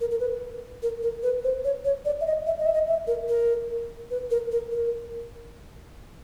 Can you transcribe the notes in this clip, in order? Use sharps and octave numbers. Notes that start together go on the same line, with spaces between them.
A#4
A#4
B4
A#4
A#4
B4
C5
C#5
C#5
D5
E5
D#5
E5
D#5
E5
D#5
E5
A#4
A#4
B4
A#4
A#4
A#4